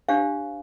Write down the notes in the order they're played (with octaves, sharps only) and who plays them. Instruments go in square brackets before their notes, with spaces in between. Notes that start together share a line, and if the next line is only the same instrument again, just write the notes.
[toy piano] D4 G4 C5 F5